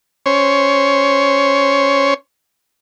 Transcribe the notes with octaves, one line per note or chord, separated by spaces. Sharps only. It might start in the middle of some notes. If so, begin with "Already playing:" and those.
C#4 C5 C#5